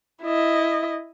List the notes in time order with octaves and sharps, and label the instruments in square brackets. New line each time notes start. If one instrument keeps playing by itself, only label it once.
[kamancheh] E4 D#5